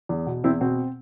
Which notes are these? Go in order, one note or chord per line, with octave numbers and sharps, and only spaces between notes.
E2
B2
E2 C4 E4
B2 C4